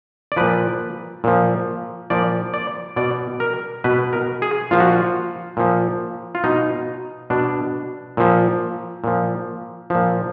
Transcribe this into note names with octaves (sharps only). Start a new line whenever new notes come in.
D5
A#2 F3 B4
A#2 F3
A#2 F3 D5
D5
B2 D5
A#4
B2 B4
A#4
G#4
A#2 F3 F4
F#4
F4
A#2 F3
F4
B2 D#4
B2 D4
A#2 F3
A#2 F3
A#2 F3